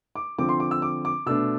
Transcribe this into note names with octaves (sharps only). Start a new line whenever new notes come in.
D6
D3 F3 C4 D6
C6
D6
E6
D6
D6
B2 A3 D4 E6